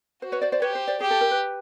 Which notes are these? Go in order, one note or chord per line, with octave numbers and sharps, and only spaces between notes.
F#4 C5
B4 C#5
C5 D5
C5 D5
G4 B4 C#5
C5
C5 D5
G4 G#4
A4
A#4
B4